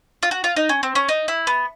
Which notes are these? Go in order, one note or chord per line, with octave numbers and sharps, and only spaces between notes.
F4
F#4
F4
D#4
C#4
C4
C#4
D#4
E4
B3